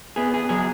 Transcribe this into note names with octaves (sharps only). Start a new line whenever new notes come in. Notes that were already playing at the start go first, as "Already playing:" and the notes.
B3 G#4
G#4
F#3 G#4